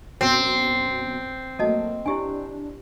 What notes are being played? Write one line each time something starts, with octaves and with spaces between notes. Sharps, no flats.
F#2 B2 C4
F#3 A3 A#3 A4 D#5 A5
D4 E4 G4 G#5